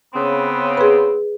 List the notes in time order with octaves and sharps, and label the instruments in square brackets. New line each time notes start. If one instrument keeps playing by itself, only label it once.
[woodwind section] C#3 B3 C4
[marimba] G#4 B4